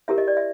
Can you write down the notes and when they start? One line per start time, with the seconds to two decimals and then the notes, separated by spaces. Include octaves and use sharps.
0.08 E4 G4 A#4 E5
0.18 D#5
0.28 D5
0.37 E5